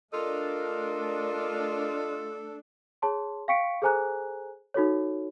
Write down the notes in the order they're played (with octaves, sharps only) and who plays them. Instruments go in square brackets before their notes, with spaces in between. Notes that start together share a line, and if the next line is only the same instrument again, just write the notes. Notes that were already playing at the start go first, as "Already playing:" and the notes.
[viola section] A3 D4 [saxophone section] F4 D#5 [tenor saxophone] A4 [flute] A#4
[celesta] G#4 C#5 A5 C6
F5 G5 C#6 B6 C#7 D7
G#4 A4 C5 G#5 A#5 F#6
D#4 F#4 A4 C#5